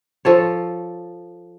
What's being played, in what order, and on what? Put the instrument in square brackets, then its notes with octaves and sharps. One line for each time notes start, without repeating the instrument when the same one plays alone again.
[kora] F3 A4 C#5